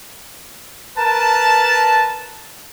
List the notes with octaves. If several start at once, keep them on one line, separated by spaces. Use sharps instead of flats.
A#4 B4 A5